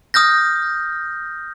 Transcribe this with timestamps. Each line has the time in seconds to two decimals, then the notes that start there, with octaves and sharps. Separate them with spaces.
0.14 D#6 F6 G6 A#6